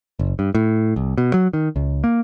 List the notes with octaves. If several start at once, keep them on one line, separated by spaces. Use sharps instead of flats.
F#1
G2
A2
C2
B2
F#3
D#3
C#2
A#3